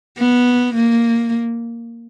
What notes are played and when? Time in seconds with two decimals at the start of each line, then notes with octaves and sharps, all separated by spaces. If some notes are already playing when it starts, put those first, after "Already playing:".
0.18 B3
0.75 A#3